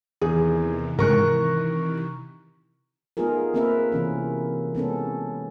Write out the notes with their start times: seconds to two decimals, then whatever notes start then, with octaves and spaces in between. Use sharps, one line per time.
0.22 E2 C3 D#3 E3 G#4
0.99 G#2 C#3 G#3 A#4 A#5 C#6 F#6
3.17 A3 B3 D#4 F4 G#4 A#4
3.54 A#3 C4 G#4 A#4 B4 E5
3.92 C3 E3 C#4
4.75 G#3 B3 C#4 A4